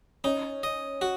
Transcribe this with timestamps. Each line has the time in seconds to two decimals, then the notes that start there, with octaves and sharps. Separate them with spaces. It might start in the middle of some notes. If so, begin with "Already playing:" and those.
0.24 C#4 D#4
0.63 D#5
1.01 F#4